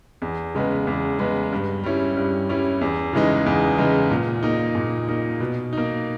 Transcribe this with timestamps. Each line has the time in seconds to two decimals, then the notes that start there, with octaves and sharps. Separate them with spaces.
0.22 E2
0.55 C#3 G#3 B3
0.87 E2
1.19 C#3 G#3 B3
1.52 G2
1.84 G3 C#4 E4
2.17 G2
2.49 G3 C#4 E4
2.81 E2
3.13 C#3 E3 G#3 D#4
3.46 E2
3.78 C#3 E3 G#3 D#4
4.11 A#2
4.43 A#3 D#4
4.75 A#2
5.09 A#3 D#4
5.40 B2
5.73 A#3 D#4